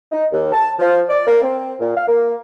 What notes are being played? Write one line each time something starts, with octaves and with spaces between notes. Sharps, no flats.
D#4
D#2
A5
F3
D5
A#3
C4
A#2
F5
A#3